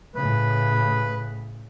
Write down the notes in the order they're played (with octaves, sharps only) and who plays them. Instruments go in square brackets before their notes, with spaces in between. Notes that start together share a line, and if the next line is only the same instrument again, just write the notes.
[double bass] A2 C#3 [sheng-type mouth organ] B4